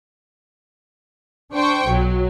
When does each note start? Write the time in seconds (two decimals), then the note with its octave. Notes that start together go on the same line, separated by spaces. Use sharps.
1.53 D4 C5 G5 C#6
1.87 B1 F#3